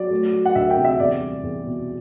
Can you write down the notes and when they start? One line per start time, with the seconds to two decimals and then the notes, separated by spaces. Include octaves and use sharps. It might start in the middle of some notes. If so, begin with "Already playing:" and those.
Already playing: F#3 D5
0.11 A3
0.33 F#3
0.45 F#5
0.55 D2 E5
0.70 G5
0.77 C3
0.85 E5
1.00 E2 D5
1.21 G3
1.43 E2
1.66 B2